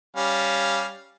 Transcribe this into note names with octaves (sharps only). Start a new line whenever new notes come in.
G3 C#4 F5